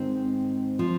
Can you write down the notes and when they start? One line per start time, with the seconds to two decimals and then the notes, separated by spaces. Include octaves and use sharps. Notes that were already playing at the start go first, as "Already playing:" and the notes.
Already playing: G#2 D#3 C4
0.79 F3